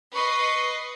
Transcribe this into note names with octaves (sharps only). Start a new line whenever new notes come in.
B4 D#5 C#6 C7